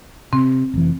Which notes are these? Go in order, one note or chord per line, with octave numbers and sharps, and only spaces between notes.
C3 C4
F1 E3